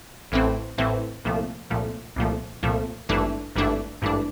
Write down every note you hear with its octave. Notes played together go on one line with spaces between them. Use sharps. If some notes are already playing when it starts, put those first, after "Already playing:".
A1 A2 E3 A3 C4
A1 A2 E3 A3 C4
C2 A#2 F3 A3
C2 A#2 F3 A3
C2 A#2 F3 A3
C2 A#2 F3 A3
G#1 G2 E3 A3 D4
G#1 G2 E3 A3 D4
G#1 G2 E3 A3 D4